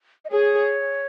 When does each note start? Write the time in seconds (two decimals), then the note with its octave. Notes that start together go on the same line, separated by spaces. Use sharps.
0.25 D#5
0.31 G#4 C#5